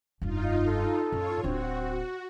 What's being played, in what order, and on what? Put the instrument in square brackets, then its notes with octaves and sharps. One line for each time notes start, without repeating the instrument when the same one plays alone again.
[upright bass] F1 G2 [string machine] D#4 F4
[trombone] A4
[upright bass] F#2 [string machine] F4 C#5
[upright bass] D1 D4 [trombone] C4 [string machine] F#4